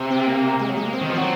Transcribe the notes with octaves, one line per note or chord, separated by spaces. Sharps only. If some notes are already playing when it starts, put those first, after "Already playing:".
Already playing: C3
C4
A#3
G#3
F#3
G#3
A#3
C4
D#3
F3
F#3 C4